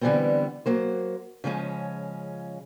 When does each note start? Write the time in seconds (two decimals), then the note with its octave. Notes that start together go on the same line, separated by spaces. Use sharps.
0.01 D3 E3 F3 G3 B3 C4
0.66 F#3 A#3 C5
1.44 C#3 F3 G#3 C#4